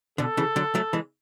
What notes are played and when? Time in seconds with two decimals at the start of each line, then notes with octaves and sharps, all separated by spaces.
0.18 B2 D3 A4
0.37 C#3 E3
0.56 D3 F#3
0.75 F#3 A3
0.93 E3 G#3